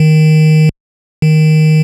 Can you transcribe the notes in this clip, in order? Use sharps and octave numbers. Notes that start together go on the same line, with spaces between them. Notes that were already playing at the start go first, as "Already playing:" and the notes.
Already playing: D#3
D#3